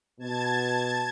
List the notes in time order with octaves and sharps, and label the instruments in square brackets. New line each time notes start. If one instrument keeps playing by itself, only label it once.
[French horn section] B2 [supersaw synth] A5 G#6 A6